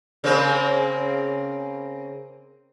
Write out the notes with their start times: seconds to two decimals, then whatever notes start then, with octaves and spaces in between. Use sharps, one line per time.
0.24 C#3 A#3 C4